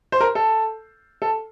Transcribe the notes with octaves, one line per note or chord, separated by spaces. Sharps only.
C5
A#4
A4
A4